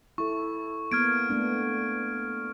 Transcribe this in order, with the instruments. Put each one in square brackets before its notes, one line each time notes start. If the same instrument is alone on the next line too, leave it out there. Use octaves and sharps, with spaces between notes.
[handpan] E4 A4 [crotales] C#6
[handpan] A#3 B3 [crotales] F6 G#6 D7
[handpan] A3 B3 D4